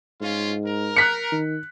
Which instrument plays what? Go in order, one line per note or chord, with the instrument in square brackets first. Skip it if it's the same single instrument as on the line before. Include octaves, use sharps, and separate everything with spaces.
[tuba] G#2 [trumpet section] C#4 F4
[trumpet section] A#4
[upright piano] F#6 B6 C#7
[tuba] D#3